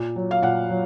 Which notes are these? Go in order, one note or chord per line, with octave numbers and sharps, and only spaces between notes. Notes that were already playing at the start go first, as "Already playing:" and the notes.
Already playing: A#2
F#3
F5
A#2 F#5
F#3